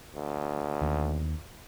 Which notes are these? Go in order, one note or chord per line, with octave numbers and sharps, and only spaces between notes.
D2
D#2